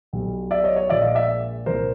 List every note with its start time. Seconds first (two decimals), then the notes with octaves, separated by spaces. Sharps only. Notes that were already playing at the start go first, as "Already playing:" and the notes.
0.13 B1 B2 G3
0.51 D5 E5
0.64 C#5 D#5
0.76 C#5 D#5
0.90 A#1 A#2 F3 G#3 D5 E5
1.02 D#5 F5
1.15 D5 E5
1.66 C2 A#2 F3 A#4 C5